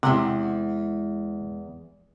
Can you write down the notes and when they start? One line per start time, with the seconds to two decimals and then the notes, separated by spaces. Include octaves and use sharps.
0.03 E2 C3 G#3 F#5